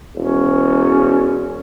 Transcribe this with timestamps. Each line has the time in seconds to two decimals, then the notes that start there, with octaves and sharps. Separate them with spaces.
0.15 E1 C#4